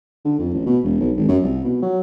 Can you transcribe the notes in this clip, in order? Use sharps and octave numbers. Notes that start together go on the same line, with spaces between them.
D3
F2
A1
B2
E1
B1
G#1
F#2
C2
B2
F#3